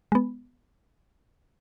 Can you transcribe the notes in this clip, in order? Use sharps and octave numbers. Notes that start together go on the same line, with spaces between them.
G#3 B3